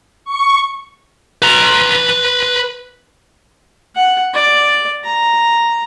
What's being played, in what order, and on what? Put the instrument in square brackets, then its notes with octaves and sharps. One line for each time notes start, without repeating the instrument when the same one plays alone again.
[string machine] C#6
[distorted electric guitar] B4 A#5
[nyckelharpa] F#5
D5
A#5